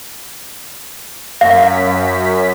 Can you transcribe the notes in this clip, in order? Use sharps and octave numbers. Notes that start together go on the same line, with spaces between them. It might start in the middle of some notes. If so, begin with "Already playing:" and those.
F#2 F5 B6